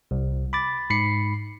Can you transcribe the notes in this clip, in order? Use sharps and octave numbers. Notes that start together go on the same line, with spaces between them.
C2
B5 D6 A6
G#2 B5 C7 C#7